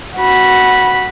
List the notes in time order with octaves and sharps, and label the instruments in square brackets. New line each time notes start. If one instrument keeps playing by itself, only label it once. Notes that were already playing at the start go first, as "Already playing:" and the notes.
[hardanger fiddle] F#4 B5